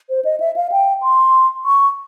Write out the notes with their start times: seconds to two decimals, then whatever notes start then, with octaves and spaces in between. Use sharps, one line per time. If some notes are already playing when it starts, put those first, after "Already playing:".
0.09 C5
0.25 D#5
0.40 E5
0.56 F5
0.72 G5
1.02 C6
1.65 C#6